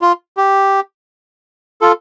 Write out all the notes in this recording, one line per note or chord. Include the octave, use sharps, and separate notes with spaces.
F4
G4
F4 A4